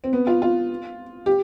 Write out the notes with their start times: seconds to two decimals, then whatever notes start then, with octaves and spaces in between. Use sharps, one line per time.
0.04 C4
0.13 B3
0.27 F4
0.42 F4
1.26 G4